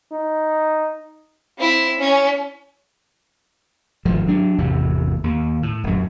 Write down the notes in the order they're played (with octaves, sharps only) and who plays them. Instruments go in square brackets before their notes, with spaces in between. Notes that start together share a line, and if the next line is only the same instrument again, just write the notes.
[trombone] D#4
[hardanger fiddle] C4 E4
C#4
[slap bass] G1 G#2 D#3 F3
F#3 D4
G#1 E2 C3
D#2
A2
D1 F#2